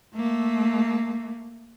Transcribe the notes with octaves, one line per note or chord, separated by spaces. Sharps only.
A3 A#3